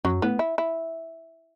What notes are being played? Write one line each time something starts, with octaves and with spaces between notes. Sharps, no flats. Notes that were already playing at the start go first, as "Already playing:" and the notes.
F#2 F#3
A2 B3
E4
E4